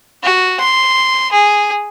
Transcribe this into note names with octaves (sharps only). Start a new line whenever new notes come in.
F#4
C6
G#4